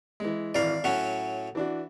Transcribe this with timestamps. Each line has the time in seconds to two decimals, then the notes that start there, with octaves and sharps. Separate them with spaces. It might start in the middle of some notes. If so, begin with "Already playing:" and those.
0.20 E3 G#3
0.55 G#1 E3 D5 F5
0.84 A2 F#3 C#4 F#5
1.55 E3 D4 F#4